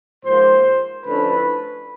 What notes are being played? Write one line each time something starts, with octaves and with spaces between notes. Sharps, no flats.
G#2 F3 A#3 C5
D3 F3 A3 C#4 E4 B4